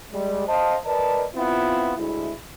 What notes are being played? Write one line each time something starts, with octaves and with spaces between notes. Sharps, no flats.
G3 G#3
C5 D#5 F5 A5
A#4 B4 D5 D#5 A5
B3 C4 E4 F4
D2 G#3 E4